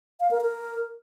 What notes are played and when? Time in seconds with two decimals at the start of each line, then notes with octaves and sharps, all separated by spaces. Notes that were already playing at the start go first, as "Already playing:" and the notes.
0.20 F5
0.31 A#4
0.41 A#4